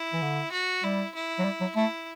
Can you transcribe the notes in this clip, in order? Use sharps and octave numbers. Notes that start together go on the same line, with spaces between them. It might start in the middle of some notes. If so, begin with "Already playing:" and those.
Already playing: E4
E3
D3
F#4
G3 E4
E4
F#3
G3
F#3
A3 E4